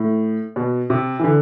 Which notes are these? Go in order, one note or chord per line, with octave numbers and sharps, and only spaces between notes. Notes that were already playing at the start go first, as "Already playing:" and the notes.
Already playing: A2
B2
C3
E3
D3